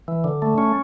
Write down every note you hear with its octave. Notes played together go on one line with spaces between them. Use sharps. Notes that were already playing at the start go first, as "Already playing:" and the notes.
E3
D3
A3
C#4